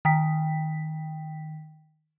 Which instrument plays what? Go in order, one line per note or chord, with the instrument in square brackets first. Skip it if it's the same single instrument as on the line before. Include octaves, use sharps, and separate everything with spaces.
[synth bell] D#3 G5 B6